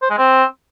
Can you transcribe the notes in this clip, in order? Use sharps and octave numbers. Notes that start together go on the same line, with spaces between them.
C5
G#3
C4